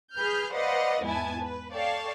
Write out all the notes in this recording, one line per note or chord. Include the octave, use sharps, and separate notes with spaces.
G#4 B4 F6 G6
B4 C5 D5 D#5 F5 F#5
E2 G#2 B3 E4 G#5 A5
B4
A4 C#5 D5 F5 G5 A5